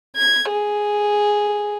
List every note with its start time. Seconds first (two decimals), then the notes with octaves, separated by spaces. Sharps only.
0.16 G#6
0.51 G#4